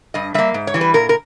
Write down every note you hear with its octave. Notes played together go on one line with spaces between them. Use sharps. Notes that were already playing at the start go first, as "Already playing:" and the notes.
G2 D#5
G3 A#3 E5
G#2
C#5
E3 G3
B4
A#2 A#4
A#4